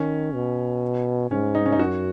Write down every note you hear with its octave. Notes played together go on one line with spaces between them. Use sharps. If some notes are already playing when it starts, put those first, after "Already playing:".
Already playing: D#3 C#4
B2
G#2 C#4
D#4
C#4
D#4
F#2 F#4